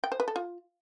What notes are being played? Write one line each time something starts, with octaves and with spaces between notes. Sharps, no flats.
G5
C5
B4
A4
F4